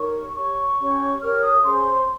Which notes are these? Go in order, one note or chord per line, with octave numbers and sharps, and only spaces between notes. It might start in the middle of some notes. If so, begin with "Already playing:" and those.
Already playing: D#4 G4 A#4 C#5 C#6
G4 C#5 C#6
C#4 G4 C#5
G4 A#4 C#5 F6
D#6
C#4 G#4 C5 C6